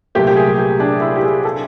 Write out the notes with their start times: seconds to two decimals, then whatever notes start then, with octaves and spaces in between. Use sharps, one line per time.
0.15 C2 A#2 F#3 A3 G4
0.27 G4
0.36 G#4
0.59 G4
0.80 D4
1.01 E4
1.16 G4
1.23 G#4
1.45 A4